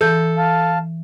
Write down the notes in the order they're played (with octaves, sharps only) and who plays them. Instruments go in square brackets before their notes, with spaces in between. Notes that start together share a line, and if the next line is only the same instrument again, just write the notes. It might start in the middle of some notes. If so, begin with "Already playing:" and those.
[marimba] E3 G6 [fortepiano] A4
[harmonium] F5 A5